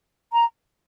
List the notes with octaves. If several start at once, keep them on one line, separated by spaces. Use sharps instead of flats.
A#5